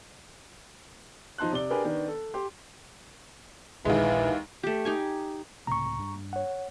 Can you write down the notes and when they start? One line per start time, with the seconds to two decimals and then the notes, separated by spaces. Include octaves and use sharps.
1.38 F3 D#4 A5 C6 F#6
1.52 C3 D5 G7
1.70 D4 G4 G#4 A#4 B4 D5
1.85 D#3 B3 D4
2.08 A4
2.34 G4 C6
3.85 A#1 D#2 E3 G#3
4.63 A3 G4
4.85 D#4 G4 G#5
5.67 C#2 A2 C3 A#5 C#6
5.99 G2
6.33 C#5 F#5